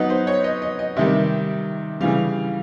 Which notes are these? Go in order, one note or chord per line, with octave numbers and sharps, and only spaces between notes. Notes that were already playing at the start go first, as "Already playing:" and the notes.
Already playing: F#3 B3 D#4 B4
C5
C#5
D#5
D#5
D#5
C3 D#3 G3 E5
C#3 E3 G3 F5